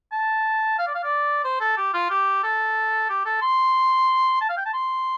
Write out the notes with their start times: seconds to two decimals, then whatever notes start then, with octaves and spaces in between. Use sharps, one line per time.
0.12 A5
0.79 F5
0.87 D5
0.95 F5
1.04 D5
1.45 C5
1.61 A4
1.77 G4
1.94 F4
2.10 G4
2.43 A4
3.09 G4
3.26 A4
3.42 C6
4.41 A5
4.49 F5
4.57 G5
4.66 A5
4.74 C6